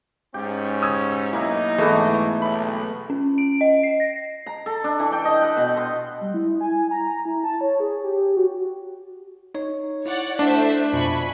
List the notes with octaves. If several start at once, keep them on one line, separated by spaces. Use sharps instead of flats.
G#2 C#4 G4
D#6 E6 G#6
B1 A#3 D#4 E4
G#2 E3 A3 B3 G#4 A4
B1 B5
C#4
D7
D#5
C7
A#6
A#5
A4
D4
E3
G5
D#5
B4
B2
C6
G3
E4
G#5
A#5
E4
A5
C#5
G#4
G4
F#4
D#4 C#5
E4 C#5 D5 F#5
A3 D4 C5 E5
F2 B2 F4 G#5 B5 C#6